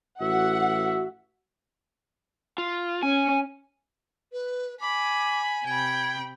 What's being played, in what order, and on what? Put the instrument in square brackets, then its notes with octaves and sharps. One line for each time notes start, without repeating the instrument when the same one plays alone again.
[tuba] A1 [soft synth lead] F#4 [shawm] E5 [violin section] F#5
[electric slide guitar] F4
[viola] C#4 [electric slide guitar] G#5
[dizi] B4
[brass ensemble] G#5 [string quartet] B5 [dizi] D6
[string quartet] C3 G5 B5 [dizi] G#6